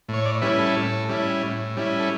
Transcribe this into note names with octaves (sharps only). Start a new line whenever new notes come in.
A2
C#5
D5
G3 C#4 E4 B4
A4
A2
G3 C#4 E4
A2
G3 C#4 E4
A4